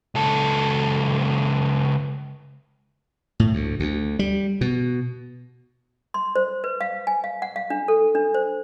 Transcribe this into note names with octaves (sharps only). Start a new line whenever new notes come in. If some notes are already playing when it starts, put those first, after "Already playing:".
C#2 A4
A2
D2
D2
G3
B2
C6
C5
B4
F5
G#5
F5
F#5
F5
D4
A4
D4
C5